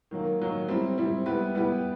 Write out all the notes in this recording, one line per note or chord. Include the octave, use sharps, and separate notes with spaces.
D#3 F#3 A#3
D#3 F#3 A#3
G3 C4 E4
G3 C4 E4
G3 B3 E4 G4 B4
G3 B3 E4 G4 B4